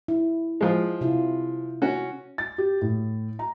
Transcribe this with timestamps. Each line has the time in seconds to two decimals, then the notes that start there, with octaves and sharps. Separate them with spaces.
0.08 E4
0.61 F3 G#3
1.01 C3 E4 F4
1.82 C#4 F#4
2.38 A6
2.58 G4
2.82 A2
3.39 A#5